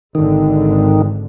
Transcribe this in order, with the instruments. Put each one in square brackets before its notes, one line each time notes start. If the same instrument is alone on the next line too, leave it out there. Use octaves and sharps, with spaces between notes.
[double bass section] G#1 D3 [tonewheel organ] D#3